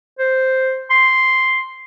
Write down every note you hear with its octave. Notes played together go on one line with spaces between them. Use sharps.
C5
C6